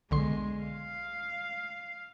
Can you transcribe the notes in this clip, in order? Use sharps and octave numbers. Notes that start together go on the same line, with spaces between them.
B1 D3 G#3 C6
F5